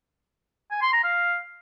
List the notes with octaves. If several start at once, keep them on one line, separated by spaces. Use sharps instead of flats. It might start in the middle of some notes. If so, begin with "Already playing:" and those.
G#5
C6
A#5
F5